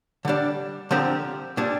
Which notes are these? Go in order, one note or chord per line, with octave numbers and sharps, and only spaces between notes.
D3 G3 D4
D3 F3 C4 G4 A#4
A#2 G3 D4